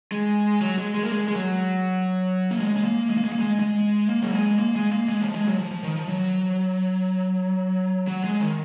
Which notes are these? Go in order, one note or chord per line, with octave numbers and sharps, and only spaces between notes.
G#3
F#3
G#3
G#3
A#3
G#3
G#3
F#3
A#3
G#3
G#3
A#3
G#3
A#3
G#3
A#3
G#3
G#3
A#3
F#3
G#3
A#3
G#3
A#3
G#3
F3
G#3
F#3
F3
F3
D#3
F3
F#3
F#3
G#3
D#3